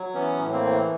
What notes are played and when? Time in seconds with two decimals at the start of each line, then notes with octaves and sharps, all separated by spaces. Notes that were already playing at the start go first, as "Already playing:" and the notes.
Already playing: F#3
0.14 E3 B3 C#4
0.39 A2
0.52 A#3 C4
0.65 E3